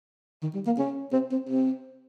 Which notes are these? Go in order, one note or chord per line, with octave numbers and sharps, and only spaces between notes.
D#3
G3
A#3
C#4
C4
C4
C4